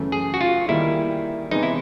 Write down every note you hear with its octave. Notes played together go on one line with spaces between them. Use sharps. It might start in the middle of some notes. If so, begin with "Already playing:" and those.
Already playing: F#2 C#3 E3 A3
G#4
F#4
F4
D#3 G3 A#3 D#4 E4 G#4
C3 E3 G#3 B3 D#4
E4